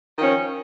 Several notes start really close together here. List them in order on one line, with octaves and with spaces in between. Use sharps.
D#3 F3 C#4